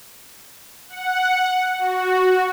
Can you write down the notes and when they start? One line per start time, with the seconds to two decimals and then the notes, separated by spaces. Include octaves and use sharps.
0.89 F#5
1.79 F#4